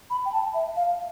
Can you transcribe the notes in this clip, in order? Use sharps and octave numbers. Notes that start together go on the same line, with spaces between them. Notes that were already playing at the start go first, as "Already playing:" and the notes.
B5
G5
A5
E5
F5